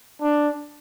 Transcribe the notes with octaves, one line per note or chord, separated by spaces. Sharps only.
D4